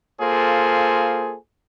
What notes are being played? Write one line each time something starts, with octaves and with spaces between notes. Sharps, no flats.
A#3 F4 G#4 A4 C5